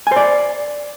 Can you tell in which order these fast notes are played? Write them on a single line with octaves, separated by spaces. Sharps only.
G#5 C5 D5